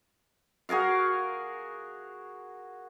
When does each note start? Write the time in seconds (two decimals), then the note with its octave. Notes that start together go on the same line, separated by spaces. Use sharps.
0.69 F#4 G#4 A#4 F5